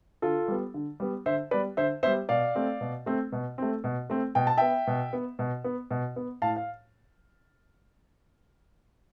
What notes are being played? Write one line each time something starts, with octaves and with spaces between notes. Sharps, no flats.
D3 F4 A4
G3 B3
D3
G3 B3
D3 C5 E5
G3 B3 B4 D5
D3 C5 E5
G3 B3 C5 E5
B2 D5 F5
A3 C4
B2
A3 C4
B2
A3 C4
B2
A3 C4
B2 G5
A5
B3 E5 G5
B2
B3
B2
B3
B2
B3
A2 F5 A5
F5